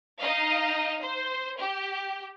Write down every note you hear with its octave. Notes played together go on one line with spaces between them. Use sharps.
D#4 D#5 F5
C5
G4